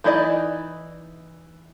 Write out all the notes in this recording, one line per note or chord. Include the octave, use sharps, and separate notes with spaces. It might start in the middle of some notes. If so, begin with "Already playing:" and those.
E3 D#4 E4 D5 D#5